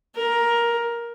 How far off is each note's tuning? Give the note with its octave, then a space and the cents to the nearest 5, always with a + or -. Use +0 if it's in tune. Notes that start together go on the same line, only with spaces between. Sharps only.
A#4 +10